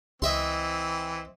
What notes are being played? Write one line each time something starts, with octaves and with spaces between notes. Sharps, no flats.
C#2 E3 C4 D#5 E5 C6